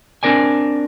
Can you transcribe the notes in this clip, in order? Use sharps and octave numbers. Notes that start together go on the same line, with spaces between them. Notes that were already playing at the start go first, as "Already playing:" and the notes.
C4 D4 A#4 D5 G#5